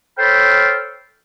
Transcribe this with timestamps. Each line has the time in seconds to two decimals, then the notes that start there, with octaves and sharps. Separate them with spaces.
0.18 A4 C5 C#5 G5 B5 F6